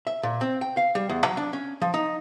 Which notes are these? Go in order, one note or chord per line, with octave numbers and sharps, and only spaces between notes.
E5
A#2
C4
G5
F5
G3
E2
F#3
D4
C#4
F3
D#4